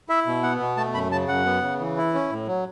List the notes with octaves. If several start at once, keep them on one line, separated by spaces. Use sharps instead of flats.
E4 E5
B2
B3 F#5
B2
A3 A5
F#2 B5
C#3 A5
F#2 F#5
B3
C#3
E3
E4
C#4
A2
F#3